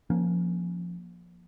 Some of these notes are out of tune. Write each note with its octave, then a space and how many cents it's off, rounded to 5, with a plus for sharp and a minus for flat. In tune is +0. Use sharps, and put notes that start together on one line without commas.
F3 +5 A#3 +20 C#4 +0